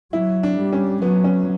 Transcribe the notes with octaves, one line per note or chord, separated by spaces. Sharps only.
F#3 E4
D4
G3
C#4
F#3 B3
C#4